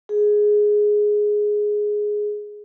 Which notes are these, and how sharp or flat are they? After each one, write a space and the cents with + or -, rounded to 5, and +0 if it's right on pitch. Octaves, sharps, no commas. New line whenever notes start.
G#4 +5